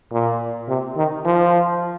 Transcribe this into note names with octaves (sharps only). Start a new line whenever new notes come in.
A#2
C3
D#3
F3